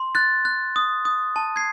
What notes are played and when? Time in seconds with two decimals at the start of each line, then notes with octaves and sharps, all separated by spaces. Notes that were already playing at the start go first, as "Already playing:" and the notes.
Already playing: C6
0.15 F#6 A6
0.45 F#6
0.76 D#6
1.05 D#6
1.36 A5
1.56 G#6 C7